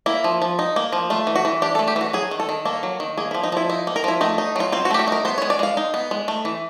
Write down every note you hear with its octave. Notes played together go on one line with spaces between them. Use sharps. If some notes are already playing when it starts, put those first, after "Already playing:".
A#3 E4
F3
F3
D#4
A#3
F3
A3 F4
E3
F#4
E3
D4 G4
A4
A3
G4
E3 F#4
F#3 G#4
D#3
A4
D#3
A#3 A4
F#3
D#3
A#3 G#4
E4
F3
D#4
F3 E4
D#4 E4
A#3
A#4
F3 E4
A3 D#4
D#4
F#3 F4
C4 F4
F#4
A3 G4
F#4
D#4 A#4
B3 C5
C#5
G#3
D5
G#3 F5
D#4
B3
G#3
A3
E3